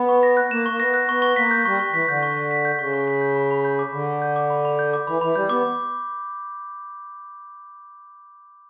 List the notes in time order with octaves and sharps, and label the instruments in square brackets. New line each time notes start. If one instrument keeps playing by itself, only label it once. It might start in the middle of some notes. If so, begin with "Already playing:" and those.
Already playing: [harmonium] B3
[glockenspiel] C#6
A#6
F#6
[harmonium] A#3 [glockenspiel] E7
[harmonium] A#3 [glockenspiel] C#6
[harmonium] B3 [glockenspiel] A#6
[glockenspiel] F#6
[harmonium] B3 [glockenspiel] C#6
[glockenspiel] C#6
[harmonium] A#3 [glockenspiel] B6
[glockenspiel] G6
[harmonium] G3 [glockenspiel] C#6
[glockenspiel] C#6
[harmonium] E3 [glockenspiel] B6
[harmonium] D3 [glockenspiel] G6
[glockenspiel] C#6
C#6
B6
G6
[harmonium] C#3 [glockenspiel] C#6
[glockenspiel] C#6
B6
G6
B5
B5
G6
D6
[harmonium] D3 [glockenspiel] B5
[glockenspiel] B5
G6
D6
B5
B5
G6
D6
[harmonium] E3 [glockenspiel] B5
[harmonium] E3 [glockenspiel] B5
[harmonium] G3 [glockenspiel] G6
[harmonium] B3 [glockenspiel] D6